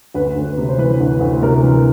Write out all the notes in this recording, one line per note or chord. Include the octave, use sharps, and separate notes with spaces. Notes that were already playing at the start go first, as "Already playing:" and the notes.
D2 B4
D2
C3
C5
E3 B4
D2
D2
C3 A#4
E3